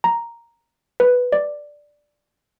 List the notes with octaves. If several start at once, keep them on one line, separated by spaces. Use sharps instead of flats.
A#5
B4
D5